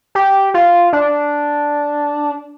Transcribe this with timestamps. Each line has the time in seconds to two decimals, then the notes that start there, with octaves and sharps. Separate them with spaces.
0.15 G4
0.54 F4
0.93 D4